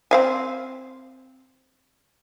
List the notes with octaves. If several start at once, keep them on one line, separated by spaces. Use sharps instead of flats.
C4 F5 G#5